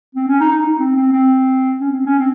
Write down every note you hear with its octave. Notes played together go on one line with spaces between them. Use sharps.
C4
C#4
D#4
D#4
D#4
C4
C4
C4
C#4
C4
C#4
C4